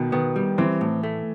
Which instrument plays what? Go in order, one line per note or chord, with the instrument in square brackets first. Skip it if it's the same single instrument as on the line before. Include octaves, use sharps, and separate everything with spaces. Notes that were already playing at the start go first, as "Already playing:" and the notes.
Already playing: [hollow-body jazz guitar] B2 [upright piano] D#3
[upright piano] D#3 [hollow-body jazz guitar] B3
[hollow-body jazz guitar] G3
[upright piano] E3 [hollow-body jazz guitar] C4
[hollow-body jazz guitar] A2
A3